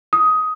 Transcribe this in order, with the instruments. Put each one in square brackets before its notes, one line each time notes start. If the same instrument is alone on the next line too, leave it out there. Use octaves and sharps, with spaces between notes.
[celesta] D#6